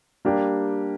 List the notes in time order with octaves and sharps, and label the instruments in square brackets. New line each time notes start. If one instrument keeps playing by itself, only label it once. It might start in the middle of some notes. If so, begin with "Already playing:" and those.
[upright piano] G3 A#3 D4 G4